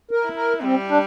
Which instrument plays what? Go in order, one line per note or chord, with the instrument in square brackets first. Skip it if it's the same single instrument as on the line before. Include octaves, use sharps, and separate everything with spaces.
[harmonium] A#4
[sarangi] E4
[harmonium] A#4
[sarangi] G3 [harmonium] C4
[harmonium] D4